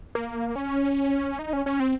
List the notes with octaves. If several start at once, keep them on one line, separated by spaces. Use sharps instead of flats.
A#3
C#4
D#4
C#4
C#4
C4